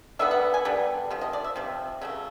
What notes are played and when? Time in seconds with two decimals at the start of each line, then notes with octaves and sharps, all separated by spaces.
0.19 D3 G3 B3 E5
0.31 F#5
0.54 G#5
0.65 D3 G3 B3
1.11 C3 F3
1.21 D#5
1.33 D5
1.44 E5
1.56 C3 F3
2.02 C#3 F#3 A3